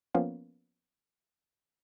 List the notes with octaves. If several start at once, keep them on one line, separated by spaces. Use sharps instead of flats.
F3 A#3 B3 C#4 F4